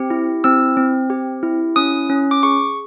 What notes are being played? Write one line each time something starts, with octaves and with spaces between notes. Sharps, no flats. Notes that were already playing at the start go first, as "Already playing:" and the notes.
Already playing: C4 G4
E4
C4 E6
C4
G4
E4
C#4 D#6
C#4
D6
G#4 C#6